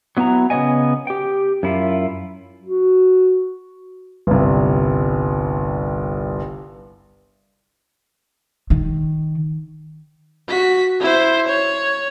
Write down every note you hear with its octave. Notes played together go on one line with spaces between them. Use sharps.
F#3 B3 E4 A5 A#5
C#3 B3 B4 C#5 D#5 G#5
G4 G5
F#2 E4 F4
F#4
G1 C2
D#3
F#4 B6
E4 C5
C#5